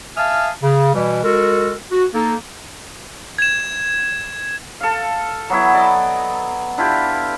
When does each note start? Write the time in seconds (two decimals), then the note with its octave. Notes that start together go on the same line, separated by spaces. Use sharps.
0.17 E5 F5 G#5 A5 D#6 F6
0.63 C#3
0.94 B2 E3 G3
1.23 G#3 F#4 A4 A#4
1.91 F#4
2.14 A#3 D#4 A4
3.38 G#6 E7
4.80 A4 F5
5.50 F#3 B3 E4
5.74 D5 D#5
6.78 D4 E4 F4 G4